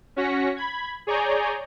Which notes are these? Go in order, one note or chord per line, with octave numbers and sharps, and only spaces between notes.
C#4 F#4 A#6 B6 C#7
B5 G#6
G#4 C#5 D5 G#5 A#5 G6